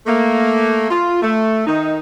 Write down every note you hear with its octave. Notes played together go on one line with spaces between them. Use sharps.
A3 A#3
F4
A3
D#3 D#4